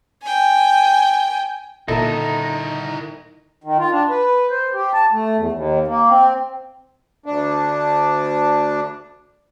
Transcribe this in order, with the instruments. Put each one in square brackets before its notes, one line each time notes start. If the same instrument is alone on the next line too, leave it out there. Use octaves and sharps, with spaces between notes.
[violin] G5 G#5
[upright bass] A#2 D3 [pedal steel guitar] D#4 [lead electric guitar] E4 A#4 [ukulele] A4 E5
[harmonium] D#3
F4
D4
B4
C5
G4
A5
A3
E2
D#2
A#3
C4
[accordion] D2 D4